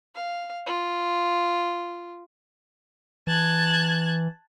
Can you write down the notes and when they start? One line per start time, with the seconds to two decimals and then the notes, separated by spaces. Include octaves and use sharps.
0.15 F5
0.67 F4
3.27 E3 A5 F#6 G#6